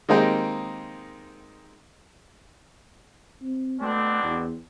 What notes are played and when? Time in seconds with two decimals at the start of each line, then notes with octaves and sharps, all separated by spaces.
0.09 D#3 G#3 A#3 C4 D#4 G4
3.42 C4
3.81 B2 A3 C4 D4
4.24 E2